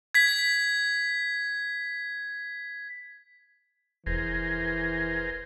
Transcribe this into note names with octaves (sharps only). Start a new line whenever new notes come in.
G#6 B6
F1 E3 G#4 A#4 C5